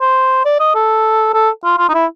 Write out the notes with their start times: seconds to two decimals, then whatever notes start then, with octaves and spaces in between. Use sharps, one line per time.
0.01 C5
0.45 D5
0.60 D#5
0.75 A4
1.34 A4
1.64 F4
1.78 F4
1.89 D#4
1.94 E4